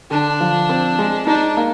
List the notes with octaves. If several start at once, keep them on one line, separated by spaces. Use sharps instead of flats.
D3 D4
F3
C4
G#3
D4 D#4
A#3